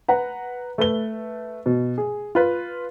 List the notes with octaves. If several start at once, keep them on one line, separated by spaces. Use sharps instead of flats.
B4 F#5 A#5
A3 B4 G7
B2
G#4
F4 B4